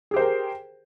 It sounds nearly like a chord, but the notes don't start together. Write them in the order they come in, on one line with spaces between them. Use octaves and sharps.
G#4 G4 C5 A#4 G5